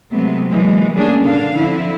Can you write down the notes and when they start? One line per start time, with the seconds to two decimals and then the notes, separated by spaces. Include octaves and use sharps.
0.12 C3 F#3 G#3 A3 B3 C4
0.51 E3 F#3 G#3 A#3
0.94 G3 A3 A#3 C#4 D4 G#4
1.23 A#2 D3 D4 F5
1.55 D3 F3 C4 E4